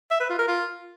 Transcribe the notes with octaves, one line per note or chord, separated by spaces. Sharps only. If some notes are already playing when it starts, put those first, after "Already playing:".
E5
B4
F4
A#4
F4